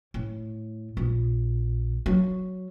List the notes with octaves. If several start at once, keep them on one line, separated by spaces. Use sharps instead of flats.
A2
A#1
F#3